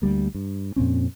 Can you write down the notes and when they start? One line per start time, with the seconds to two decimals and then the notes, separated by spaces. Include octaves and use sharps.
0.02 D2 G3 A#3
0.35 G2
0.76 F2 A#2 C4 C#4